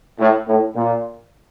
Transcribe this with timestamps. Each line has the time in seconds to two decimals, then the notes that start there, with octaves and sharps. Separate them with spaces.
0.19 A2
0.48 A2
0.76 A#2